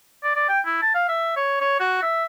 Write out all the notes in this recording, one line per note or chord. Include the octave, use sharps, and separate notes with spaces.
D5
D5
G5
E4
A5
F5
E5
C#5
C#5
F#4
E5